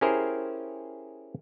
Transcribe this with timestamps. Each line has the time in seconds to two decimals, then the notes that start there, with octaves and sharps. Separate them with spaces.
0.01 C#4 E4 G4 G#4 A#4 C5